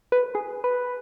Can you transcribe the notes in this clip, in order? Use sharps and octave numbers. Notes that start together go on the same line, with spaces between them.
B4
G#4
B4